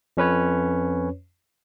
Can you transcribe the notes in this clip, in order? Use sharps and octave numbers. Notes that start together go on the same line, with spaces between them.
F2 C#4 B4 C#5